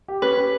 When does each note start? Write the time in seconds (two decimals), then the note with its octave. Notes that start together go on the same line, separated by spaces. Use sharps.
0.08 G4
0.22 C#4 B4
0.37 G4